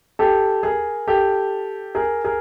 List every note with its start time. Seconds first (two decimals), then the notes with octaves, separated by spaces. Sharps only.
0.19 G4 A4
0.63 G#4 A#4
1.07 G4 A4
1.95 G#4 A#4
2.24 G#4 A#4